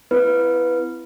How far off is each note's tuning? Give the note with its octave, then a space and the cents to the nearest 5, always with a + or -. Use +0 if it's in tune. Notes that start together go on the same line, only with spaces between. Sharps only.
C4 -40 E4 +15 B4 +0